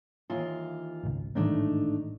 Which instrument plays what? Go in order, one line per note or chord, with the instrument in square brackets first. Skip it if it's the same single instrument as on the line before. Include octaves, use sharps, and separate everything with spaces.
[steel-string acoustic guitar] D#2 E3 F4
[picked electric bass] G#1 C#2
[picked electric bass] A1 G#2 D#3 [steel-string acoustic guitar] A3 D4 D#4